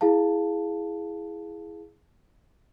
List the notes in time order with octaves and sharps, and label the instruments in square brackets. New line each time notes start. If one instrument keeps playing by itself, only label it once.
[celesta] E4 G#4 F5 A5